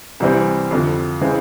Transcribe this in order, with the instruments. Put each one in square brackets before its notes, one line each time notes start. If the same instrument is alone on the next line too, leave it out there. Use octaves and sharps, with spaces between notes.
[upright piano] C2 C3 E3 G3 C4
F2 D3 F3
C#3 E3 G#3 C4